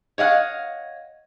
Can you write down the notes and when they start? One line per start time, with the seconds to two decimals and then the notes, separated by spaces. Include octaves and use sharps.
0.18 C#5 D#5 F5 F#5